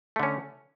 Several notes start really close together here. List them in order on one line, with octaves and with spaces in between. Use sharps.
A3 D3 C#4